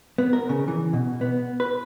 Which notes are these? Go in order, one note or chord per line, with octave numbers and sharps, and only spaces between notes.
B3
A#4
C#3
E3
B2
B3
B4